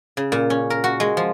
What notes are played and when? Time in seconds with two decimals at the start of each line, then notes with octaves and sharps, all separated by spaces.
0.17 C#3
0.32 A#2
0.50 C#4
0.70 A#4
0.84 F#4
1.00 G#3
1.17 F3